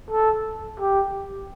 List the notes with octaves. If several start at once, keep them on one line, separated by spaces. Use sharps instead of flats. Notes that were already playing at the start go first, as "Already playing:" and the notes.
A4
G4